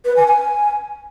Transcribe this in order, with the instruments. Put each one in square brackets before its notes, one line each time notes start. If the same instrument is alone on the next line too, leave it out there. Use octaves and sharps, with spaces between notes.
[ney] B4
G#5
G#5